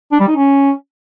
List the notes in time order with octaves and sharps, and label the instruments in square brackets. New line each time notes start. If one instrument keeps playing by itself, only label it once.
[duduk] D4
G3
D#4
C#4